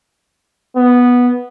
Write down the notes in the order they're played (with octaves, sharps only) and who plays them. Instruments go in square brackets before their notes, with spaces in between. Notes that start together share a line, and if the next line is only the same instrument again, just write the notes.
[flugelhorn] B3